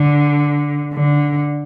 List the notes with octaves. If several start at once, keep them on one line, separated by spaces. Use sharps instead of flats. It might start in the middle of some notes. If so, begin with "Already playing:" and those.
Already playing: D3
D3